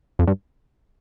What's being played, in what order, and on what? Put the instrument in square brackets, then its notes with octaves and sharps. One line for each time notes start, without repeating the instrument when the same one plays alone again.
[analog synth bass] F2
G2